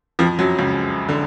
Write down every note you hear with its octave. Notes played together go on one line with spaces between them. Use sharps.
F2 F3
F#2 F#3
C#2 C#3
D3